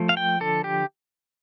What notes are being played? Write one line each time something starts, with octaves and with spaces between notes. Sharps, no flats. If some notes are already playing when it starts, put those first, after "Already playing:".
Already playing: F3 A3
F5
G5
D3 A4
G4